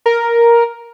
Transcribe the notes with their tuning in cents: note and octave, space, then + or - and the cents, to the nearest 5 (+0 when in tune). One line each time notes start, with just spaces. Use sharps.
A#4 +5